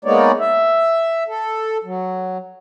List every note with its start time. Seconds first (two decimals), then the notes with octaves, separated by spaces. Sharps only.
0.05 G#3 A#3 B3 D#4 C#5 D5
0.40 E5
1.28 A4
1.84 F#3